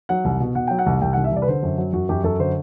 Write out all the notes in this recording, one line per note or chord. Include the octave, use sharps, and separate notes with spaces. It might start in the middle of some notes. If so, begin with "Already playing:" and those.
F#3 F#5
C2
B2
B2 F#5
F#3 G5
F#5
C2
C2 G5
F#5
C2
E5
C2 D5
B4
D3 C5
F#2
F#3
F#2 F#4
F#2 G4
F#2 A4
D3 C5